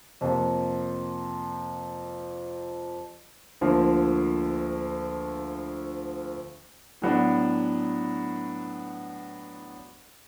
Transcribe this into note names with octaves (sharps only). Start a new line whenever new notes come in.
F2 C3 F3 A#3
D2 D3 F3 A#3
A2 F#3 B3 D4